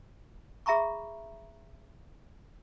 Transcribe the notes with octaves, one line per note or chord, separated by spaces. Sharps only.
G#4 E5 A#5 B5 C#6